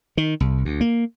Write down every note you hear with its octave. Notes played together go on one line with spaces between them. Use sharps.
D#3
C2
D2
A#3